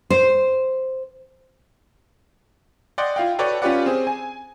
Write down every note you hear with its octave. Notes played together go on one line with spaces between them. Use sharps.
C5
D5 D#5 F#5 G5 C6
E4 F4 F5 G5
F#4 A4 B4 C#5 D5 G5
C#4 F4 G4 B4 D5 F#5
C4 G#4
G#5